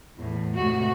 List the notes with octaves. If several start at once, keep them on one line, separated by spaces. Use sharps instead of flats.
E2 A2
A2 C3 G#3 F#4